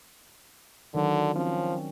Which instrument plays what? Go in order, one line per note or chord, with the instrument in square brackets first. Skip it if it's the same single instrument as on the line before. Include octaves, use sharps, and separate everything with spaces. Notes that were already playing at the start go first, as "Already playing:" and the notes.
[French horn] D3 [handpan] D#3 F#3 D4
[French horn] F3 [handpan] C4 C#4